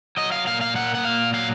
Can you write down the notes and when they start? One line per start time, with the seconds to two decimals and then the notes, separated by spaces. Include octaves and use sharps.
0.17 F#3 D#5
0.32 F5
0.47 A#2 F5
0.61 F5
0.75 A#3 F#5
0.95 F#5
1.04 A#2 F5
1.33 F#3 F5